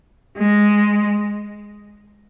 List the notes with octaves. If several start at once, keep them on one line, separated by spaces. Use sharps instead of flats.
G#3